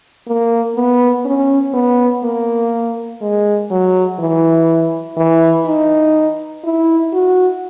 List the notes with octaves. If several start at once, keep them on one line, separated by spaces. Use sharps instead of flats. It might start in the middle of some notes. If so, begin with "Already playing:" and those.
A#3
B3
C#4
B3
A#3
G#3
F#3
E3
E3
D#4
E4
F#4